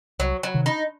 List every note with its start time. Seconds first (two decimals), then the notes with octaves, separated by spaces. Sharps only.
0.19 C2 F#3
0.43 F#3
0.54 C3 D#3
0.66 D#4